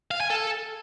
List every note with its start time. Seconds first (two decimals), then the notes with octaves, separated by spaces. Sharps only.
0.11 F5
0.21 G#5
0.30 A4